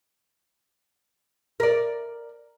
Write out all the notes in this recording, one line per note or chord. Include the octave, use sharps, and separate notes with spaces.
A#4 D5